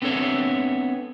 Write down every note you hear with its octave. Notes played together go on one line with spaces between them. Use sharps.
B3 C4 D4 A4 C#5 E5